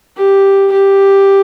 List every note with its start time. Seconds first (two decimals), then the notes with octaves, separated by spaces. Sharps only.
0.17 G4
0.72 G4